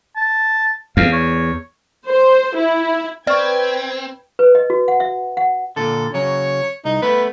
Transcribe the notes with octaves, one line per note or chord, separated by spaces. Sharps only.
A5
E2 F5
C#5
C5
E4
C4 B4 D5 G5 C#6 F6 G#6
B4
D#5
F#4
F#5
E5
F#5
A#2 D3 A4
C#3 F#3 C#5
C2 D#4
A3 B3 B4